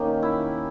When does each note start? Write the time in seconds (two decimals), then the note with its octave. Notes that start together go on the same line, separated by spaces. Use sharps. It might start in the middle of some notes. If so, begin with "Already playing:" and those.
Already playing: D#3 A#3 C#4 D#4 G4
0.23 E4